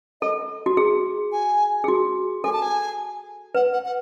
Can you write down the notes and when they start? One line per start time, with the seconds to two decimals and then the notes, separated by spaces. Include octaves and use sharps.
0.22 A4 D#5
0.66 F#4
0.77 G#4
1.32 G#5
1.84 G#4
1.88 F#4
2.44 A4 G#5
2.53 A5
2.62 G#5
3.55 B4 F#5
3.73 F#5
3.85 F#5